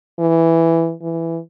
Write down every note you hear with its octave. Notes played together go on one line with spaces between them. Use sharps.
E3
E3